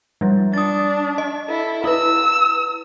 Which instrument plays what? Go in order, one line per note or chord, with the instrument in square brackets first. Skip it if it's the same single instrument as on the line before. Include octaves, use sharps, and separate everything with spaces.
[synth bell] F3 G3
[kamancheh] D4 [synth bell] D#6 A6
[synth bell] D#5
[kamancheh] E4 A4
[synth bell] E4 B4 [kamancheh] E6